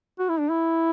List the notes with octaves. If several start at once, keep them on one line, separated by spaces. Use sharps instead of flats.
F#4
E4
D4
E4